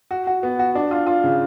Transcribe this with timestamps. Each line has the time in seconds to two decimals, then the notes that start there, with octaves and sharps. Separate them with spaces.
0.11 F#4
0.27 F#4
0.43 B3
0.59 F#4
0.75 D4
0.91 F4
1.07 F4
1.24 C#3